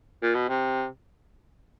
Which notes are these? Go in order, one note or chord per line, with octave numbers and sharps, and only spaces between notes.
A#2
B2
C3